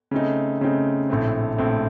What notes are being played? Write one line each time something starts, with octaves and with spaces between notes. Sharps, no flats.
C#3 A3 C4 D#4
C#3 A3 C4 D#4
A#1 A2 A3 C4
A#1 A2 A3 C4